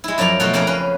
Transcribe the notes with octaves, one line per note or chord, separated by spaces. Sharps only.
G#3 E4
F#2 F3 D5 F5 A#5
B2 F3 A3 F4 F#4
F2 C#3 A#3 C#4 A#4 D5
C#4 B4